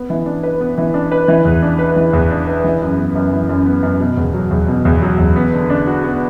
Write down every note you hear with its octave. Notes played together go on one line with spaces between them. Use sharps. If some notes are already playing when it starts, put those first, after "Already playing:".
Already playing: B3
E3
D4
B4
B3
E3
D4
B4
E3
E2
D4
B4
E3
E2
D4
B4
E3
F#2
B3
F#2
E3
F#2
B3
F#2
B2
E2
F#3
E2
B2
E2
F#3
E2
B3
D3
D4
F#4
B3